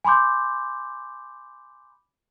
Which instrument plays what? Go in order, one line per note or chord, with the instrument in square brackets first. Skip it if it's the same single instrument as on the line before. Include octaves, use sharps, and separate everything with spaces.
[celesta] G#5 B5 C6 D6 G6